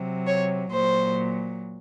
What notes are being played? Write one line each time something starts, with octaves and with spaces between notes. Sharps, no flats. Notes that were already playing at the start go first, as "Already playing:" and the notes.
Already playing: C3 F#3
C#5
A#2 C5
F#3